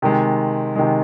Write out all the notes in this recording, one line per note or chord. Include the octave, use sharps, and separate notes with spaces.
C3 D#3 G#3
C3 D#3 G#3